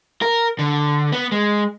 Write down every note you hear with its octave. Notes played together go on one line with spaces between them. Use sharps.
A#4
D3
B3
G#3